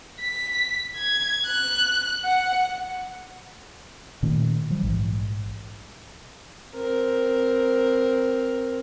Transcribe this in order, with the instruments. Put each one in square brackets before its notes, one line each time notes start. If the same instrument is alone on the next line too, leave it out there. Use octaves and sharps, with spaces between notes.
[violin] B6
G#6
F#6
F#5
[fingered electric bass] A#2 D#3 A3 C#4
F3 G3
A#1 G#2 E3
[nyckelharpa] C4 A#4